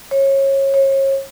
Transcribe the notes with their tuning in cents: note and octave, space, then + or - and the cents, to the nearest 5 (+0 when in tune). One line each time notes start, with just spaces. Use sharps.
C#5 -25
C#5 -35